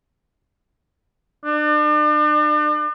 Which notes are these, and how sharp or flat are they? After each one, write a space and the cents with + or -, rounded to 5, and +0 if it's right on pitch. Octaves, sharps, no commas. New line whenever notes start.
D4 +40